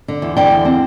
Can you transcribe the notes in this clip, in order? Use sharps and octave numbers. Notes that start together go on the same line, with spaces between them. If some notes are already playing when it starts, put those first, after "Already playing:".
D3
E2
D3 D5 G5
E2
C4